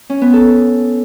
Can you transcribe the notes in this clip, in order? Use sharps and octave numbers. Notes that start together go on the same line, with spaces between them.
C#4
B3
A4